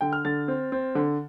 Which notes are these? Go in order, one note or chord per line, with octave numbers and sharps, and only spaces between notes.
D3 G5
F6
D3 A6
C4
C4
D3